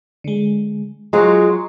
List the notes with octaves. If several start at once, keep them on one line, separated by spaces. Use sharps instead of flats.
D3 G#3
F#3 G#3 F4 A#5 C6 C#6